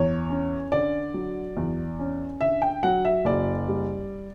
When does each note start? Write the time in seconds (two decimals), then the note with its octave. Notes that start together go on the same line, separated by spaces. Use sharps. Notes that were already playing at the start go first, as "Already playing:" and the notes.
Already playing: E2 C#5
0.30 C#4
0.72 D3 D5
1.14 F#3
1.57 E2
1.99 C#4
2.41 D3 E5
2.62 G5
2.83 F#3 F#5
3.05 E5
3.25 F#1 D5
3.68 G3